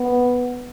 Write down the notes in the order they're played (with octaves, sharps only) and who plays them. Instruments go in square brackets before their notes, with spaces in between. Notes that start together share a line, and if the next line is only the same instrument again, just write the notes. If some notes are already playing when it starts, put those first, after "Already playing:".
Already playing: [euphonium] B3